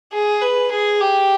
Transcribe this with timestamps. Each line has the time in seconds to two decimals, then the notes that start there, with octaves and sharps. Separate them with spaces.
0.13 G#4
0.42 B4
0.71 G#4
1.00 G4